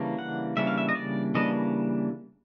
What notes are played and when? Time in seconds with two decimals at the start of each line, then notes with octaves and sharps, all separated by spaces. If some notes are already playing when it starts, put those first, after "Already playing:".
Already playing: C#3 E3 G3 A#3 D4
0.19 F#5
0.57 C#3 E3 G3 A#3 D4 E5
0.67 F5
0.78 E5
0.89 D#5
0.95 D5
1.35 C#3 E3 G3 A#3 D4 D#5